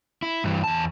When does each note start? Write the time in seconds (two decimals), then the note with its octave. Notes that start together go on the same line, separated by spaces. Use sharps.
0.22 E4
0.44 G2 E3
0.64 E2 A5